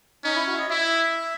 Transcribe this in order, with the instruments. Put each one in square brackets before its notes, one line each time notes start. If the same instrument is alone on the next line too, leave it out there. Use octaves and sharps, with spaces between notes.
[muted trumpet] C#4 [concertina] D#4
[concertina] E4
F#4
E5
D#5
[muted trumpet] E4 [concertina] E5